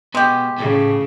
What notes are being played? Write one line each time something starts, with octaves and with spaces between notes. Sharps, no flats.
B2 G#3 G4
A2 C#3